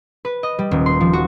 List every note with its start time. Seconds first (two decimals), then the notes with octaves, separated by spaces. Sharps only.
0.25 B4
0.43 D#5
0.59 G3
0.71 D#1
0.86 C6
1.00 F3
1.13 F#4